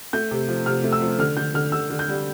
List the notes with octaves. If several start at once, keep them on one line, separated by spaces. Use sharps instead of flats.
A3 G6
C3
F3
C3 F6
A3
E6
F3
D3 F6
D3 G6
D3 F6
D3 E6
D3
G6
G3